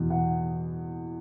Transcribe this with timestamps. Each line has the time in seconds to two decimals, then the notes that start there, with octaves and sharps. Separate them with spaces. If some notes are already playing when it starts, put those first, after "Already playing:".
Already playing: E2 B2
0.10 F#5